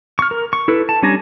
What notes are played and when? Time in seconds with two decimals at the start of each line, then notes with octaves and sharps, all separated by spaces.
0.19 C#6 F6
0.31 A#4
0.53 C#6
0.68 E4 A4 B4
0.89 A5
1.03 G3 C#4 D4 G#5 A#5